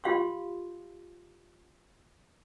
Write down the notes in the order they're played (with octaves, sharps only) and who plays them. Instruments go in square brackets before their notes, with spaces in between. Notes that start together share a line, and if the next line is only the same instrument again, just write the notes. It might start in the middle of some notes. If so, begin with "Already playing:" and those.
[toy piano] F4 G4 F5 C6 C#6